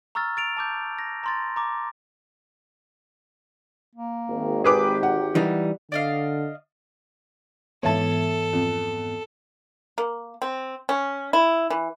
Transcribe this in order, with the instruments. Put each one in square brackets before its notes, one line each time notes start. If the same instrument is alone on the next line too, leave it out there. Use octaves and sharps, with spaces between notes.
[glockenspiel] A#5 C#6 E6 F6 A6
A6 D7 F7
A5 D6 G6
A#6
A#5 C6 A6
A#5 D6
[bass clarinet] A#3
[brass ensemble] G#1 D#3
[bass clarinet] G4 [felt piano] G#4 B4 D6
[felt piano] F#5
[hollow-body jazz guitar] E3 G3 D#4
[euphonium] D3 [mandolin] D5 D#5 F5
[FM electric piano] G#2 E3 B3 [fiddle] A4 [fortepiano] C#5 E5 A5
[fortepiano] F2
[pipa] A#3
C4
C#4
E4
E3